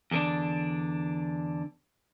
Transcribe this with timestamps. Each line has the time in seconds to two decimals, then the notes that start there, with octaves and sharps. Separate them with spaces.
0.11 E2 D3 D4